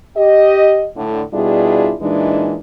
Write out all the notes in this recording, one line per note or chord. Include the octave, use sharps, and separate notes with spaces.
G4 D#5
A2 D3
B2 G3 D4 E4 F4 G#4
A#2 E3 G#3 D4 D#4